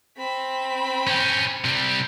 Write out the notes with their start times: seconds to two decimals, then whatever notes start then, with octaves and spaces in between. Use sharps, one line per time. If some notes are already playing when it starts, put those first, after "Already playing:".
0.18 C4 B5
1.07 C#4 G4
1.64 C3 G3